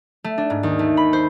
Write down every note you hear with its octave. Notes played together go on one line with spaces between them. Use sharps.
A3
D4
G#2
D#2
A3
B5
C5